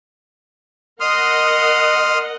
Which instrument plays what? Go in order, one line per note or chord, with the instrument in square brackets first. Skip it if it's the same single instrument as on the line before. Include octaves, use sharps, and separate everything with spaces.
[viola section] A#4 D#5 F#5 [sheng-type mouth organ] C6 D#6 F6